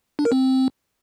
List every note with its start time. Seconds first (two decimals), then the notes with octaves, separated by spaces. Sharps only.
0.19 D4
0.25 A#4
0.32 C4